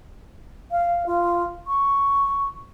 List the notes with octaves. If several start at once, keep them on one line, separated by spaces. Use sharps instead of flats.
F5
F4
C#6